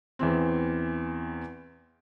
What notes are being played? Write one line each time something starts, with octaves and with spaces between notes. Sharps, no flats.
E2 E3 C4